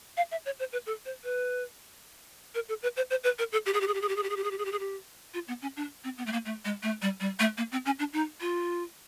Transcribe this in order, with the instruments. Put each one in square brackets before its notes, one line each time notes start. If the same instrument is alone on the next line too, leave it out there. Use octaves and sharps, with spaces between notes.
[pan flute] F5
E5
C#5
C5
B4
A4
C5
B4
A#4
A4
B4
C5
C5
B4
A#4
A4
G4
G#4
G4
G#4
G4
G#4
G4
G#4
G4
G#4
G4
G#4
G4
G#4
G4
G#4
G4
F4
B3
C#4
D4
C4
B3
A3
A#3
A3
G#3
A3
G3
G3
A3
A#3
C4
C#4
D4
D#4
F4